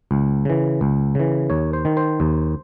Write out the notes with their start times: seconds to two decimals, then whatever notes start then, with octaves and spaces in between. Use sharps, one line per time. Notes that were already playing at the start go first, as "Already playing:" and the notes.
0.11 C#2
0.45 C#3 E3
0.81 C#2
1.15 C#3 E3
1.50 D#2 C#5
1.73 C5
1.85 D#3
1.97 C5
2.20 D#2